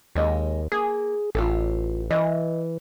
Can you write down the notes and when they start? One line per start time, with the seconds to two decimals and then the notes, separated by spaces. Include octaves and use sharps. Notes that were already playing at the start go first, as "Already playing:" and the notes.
0.15 D#2 G#3 D#5
0.72 A#3 G#4
1.35 A1 F4 G4 A4
2.11 E3 D#5